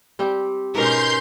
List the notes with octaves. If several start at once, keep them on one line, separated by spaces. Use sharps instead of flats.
G3 C4 G4
G#2 B2 C#4 A#4 C6 G6